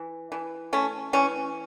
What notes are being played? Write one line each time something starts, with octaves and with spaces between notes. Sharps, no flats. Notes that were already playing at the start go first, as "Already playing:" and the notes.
Already playing: E3
E3
A3 C#4
E3 C#4